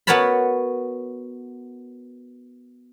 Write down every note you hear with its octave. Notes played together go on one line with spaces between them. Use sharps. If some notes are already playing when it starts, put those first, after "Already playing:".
B3 F#4 A#4 C#5 A5 B5